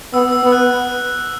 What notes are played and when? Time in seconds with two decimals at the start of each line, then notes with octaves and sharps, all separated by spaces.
0.13 B3 E6
0.32 E6
0.43 B3
0.52 F#6